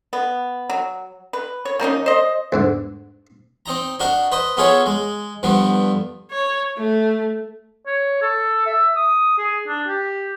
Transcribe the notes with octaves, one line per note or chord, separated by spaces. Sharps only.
B3
F#3
B4
C#5
F3 A#3 C#4 D#4
C5 D#5
E2 G#2 D3
C4 D#4 A#5
D4 D#4 F#4 A#4
B4 C5 D#5
B3 D#4 F4 G#4 A4 C#5
G#3
G2 D3 F3 B3
C#5
A3
C#5
A4
E5
D#6
G#4
D4
G4